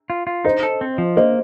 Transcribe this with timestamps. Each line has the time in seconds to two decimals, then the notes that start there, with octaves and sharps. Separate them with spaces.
0.10 F4
0.27 F4
0.45 D#4 C5 D#5
0.63 A4
0.81 C4
0.98 F3
1.17 A#3 C5 D#5